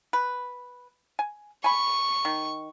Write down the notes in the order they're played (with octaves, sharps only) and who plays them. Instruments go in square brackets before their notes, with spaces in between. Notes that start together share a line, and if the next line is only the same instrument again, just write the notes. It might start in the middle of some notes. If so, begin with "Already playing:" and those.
[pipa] B4
G#5
[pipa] G#5 B5 [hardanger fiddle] C#6
[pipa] D#3